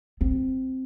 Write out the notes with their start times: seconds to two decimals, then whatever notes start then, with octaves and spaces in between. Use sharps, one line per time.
0.21 C4